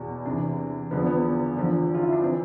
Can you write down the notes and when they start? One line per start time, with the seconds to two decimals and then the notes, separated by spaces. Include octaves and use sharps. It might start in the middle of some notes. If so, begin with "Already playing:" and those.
Already playing: E2 B2
0.25 E2 C3 E3 D4
0.91 E2 D3 F3 B3
1.07 B3
1.56 E2 D3 F3
1.94 F4
2.03 E4
2.13 D4
2.22 E3 C4